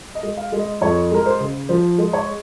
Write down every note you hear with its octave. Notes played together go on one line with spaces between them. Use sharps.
D#5
G#3
F5
G#3
D#5
F2 C#5
G#3 A#4
C5
C#3
F3 C5
G#3
C#5